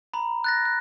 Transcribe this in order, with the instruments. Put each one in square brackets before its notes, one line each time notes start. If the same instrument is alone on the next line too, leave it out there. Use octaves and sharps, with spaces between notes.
[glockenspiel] A#5 B5
F#6 A6 A#6
F#6